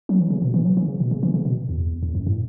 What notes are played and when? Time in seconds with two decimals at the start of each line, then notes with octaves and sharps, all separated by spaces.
0.09 F#3
0.20 E3
0.30 C#3
0.42 B2
0.54 E3
0.65 F#3
0.77 E3
0.88 C#3
1.00 B2
1.11 C#3
1.23 E3
1.34 C#3
1.45 B2
1.69 E2
2.03 E2
2.15 F#2
2.27 A2